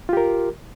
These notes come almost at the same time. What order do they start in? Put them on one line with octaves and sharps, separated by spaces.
F4 G4 A#4